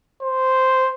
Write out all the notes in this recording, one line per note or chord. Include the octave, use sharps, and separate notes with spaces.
C5